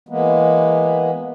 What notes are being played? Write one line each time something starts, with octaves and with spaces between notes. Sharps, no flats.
E3 G#3 A#3 B3